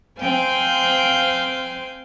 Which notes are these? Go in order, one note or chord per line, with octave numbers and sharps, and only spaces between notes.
C4 C5 F5 G5 G#5